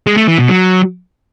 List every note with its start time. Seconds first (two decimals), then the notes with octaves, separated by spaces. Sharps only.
0.07 G#3
0.17 A3
0.28 E3
0.38 B2
0.49 F#3